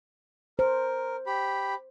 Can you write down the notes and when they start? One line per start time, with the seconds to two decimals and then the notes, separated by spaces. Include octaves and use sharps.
0.59 A#4 C5
1.27 G4 B5